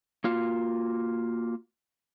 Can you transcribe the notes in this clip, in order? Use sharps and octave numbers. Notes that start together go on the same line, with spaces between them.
A#3 F4 F#4